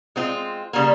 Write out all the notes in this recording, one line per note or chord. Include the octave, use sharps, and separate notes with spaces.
G#3 C4 F4
C#3 G3 A#3